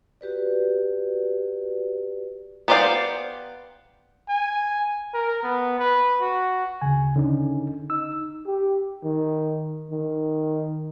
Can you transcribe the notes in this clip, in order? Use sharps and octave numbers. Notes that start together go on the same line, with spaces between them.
F#4 G4 B4 D5
B3 G4 C5 D5 F5
G#5
A#4
B3
B4
F#4
D2 C#3 G#5
D3 C#4 D#4
D#4 E6
G4
D#3
D#3